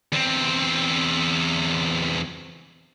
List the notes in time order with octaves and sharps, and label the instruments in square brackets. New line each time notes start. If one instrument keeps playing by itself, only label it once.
[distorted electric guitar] E2 C4